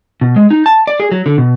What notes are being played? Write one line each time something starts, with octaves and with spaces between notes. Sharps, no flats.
B2
G#3
D#4
A5
D5
G#4
F#3
D3
B2